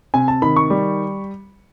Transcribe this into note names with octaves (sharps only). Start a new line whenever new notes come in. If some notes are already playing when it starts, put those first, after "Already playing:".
C3 G#5
A5
D#3 B5
C#6
G3